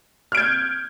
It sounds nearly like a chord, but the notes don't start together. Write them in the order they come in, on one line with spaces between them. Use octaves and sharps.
F6 D7 G#6 G6